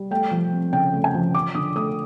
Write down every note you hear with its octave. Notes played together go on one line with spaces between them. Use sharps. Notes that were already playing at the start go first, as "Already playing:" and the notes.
Already playing: G3
A3 G5
F3
C4
C#3 G5
A3
G#5
F3
F3 D6
D3 D#6
A3 D#6